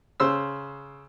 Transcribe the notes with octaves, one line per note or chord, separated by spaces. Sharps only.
C#3 C5 E6